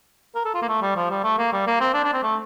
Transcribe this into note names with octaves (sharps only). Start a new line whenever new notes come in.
A#4
A4
F4
A#3
A3
G3
F3
G3
A3
A#3
G3
A#3
C4
D4
D4
C4
A3